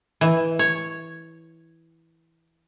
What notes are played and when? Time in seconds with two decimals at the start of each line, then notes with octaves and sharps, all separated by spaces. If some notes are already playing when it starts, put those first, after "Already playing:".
0.21 E3
0.59 C#5